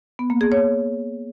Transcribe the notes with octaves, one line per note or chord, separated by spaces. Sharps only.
B3
A#3
G#4
C#5